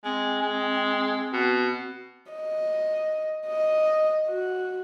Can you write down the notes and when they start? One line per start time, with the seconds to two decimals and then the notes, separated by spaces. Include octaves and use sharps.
0.04 G#3 C4
0.42 G#3
1.33 B2
2.32 D#5
3.47 D#5
4.27 F#4